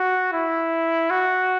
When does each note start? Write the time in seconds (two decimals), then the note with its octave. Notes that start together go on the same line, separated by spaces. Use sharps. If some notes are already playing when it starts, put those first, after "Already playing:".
Already playing: F#4
0.33 E4
1.10 F#4